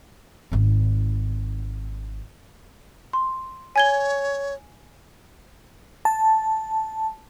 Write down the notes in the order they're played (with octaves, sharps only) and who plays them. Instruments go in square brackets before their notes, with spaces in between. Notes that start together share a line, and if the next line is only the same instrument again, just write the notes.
[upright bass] G#1 D#4
[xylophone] C6
[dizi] C#5 [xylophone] G#5 G#6 G7
[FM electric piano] A5